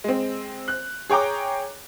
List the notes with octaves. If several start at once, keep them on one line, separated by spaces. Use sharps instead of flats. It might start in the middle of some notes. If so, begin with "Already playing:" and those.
G#3 C4
F#6
G#4 C#5 G5 A#5 D6